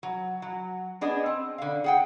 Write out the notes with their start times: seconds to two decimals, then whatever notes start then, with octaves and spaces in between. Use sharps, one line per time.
0.03 F#3
0.42 F#3
1.01 B3 D4 G#4 D#5
1.26 C4
1.58 D3 F5
1.84 G#4 F#5 G5